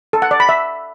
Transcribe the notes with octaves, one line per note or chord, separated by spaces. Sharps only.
A4
F#5
D5
B5
E5